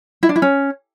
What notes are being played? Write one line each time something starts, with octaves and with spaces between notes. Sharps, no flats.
E4
D4
E4
C#4